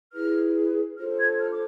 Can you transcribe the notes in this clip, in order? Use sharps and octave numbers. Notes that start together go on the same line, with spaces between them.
E4 G#4 B4 F6
D4 F4 A4 C5 F6
G#6
F6
D6